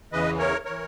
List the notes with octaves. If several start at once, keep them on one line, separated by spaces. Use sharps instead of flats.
E2 C#3 E3 B4 D#5
A#4 C#5
E3 A#4 C#5